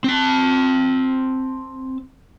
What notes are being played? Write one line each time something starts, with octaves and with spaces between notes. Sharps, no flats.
C4 A5